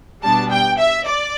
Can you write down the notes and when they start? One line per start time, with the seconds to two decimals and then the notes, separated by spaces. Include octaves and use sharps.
0.23 B2 G3 B3 D4 A5
0.51 G5
0.79 E5
1.07 D5